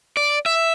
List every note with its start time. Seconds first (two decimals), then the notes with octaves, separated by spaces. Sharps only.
0.17 D5
0.46 E5